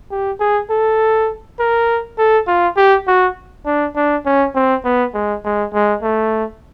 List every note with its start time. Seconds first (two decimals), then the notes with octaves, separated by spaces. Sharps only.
0.11 G4
0.40 G#4
0.70 A4
1.59 A#4
2.18 A4
2.48 F4
2.77 G4
3.08 F#4
3.66 D4
3.96 D4
4.26 C#4
4.55 C4
4.85 B3
5.14 G#3
5.44 G#3
5.74 G#3
6.03 A3